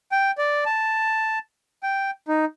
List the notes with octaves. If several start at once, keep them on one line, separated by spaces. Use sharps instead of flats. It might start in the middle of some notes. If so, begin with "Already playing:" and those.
G5
D5
A5
G5
D#4